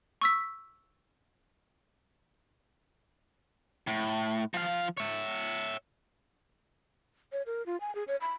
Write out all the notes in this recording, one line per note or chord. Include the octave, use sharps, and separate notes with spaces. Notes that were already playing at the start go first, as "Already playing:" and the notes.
C#6 E6 B6
A2
F3 F5
C#5 E5
C#5
A#4
F4
G#5
G#4
C#5
B5